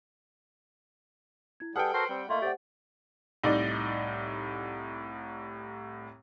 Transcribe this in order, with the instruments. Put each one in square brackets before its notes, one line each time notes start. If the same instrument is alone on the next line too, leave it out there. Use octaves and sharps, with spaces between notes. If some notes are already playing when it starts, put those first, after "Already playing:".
[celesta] E4 G#6
[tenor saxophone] G3 [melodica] G#4 A4 [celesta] B4 F6 C#7 [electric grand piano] F#5 G5
[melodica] F#4 A4 A#4 [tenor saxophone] C5
[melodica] G3 [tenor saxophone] C4
[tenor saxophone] A3 [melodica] A#3 F4 [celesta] D#5 C6
[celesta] G4 C5 F#5 [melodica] D5 G5
[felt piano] C2 A2 [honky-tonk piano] D#4 D5